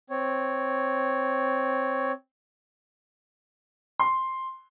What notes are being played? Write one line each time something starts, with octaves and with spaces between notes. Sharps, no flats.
C4 C#5
C6